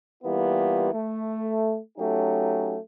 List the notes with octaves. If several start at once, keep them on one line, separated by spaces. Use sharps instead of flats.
E3 G3 A#3 B3 F4
A3
F#3 A3 C#4 D#4 G4